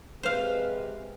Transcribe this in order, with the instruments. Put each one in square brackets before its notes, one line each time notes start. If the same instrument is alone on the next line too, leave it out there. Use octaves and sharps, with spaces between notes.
[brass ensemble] C3 G#3 [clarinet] B4 [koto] C5 F5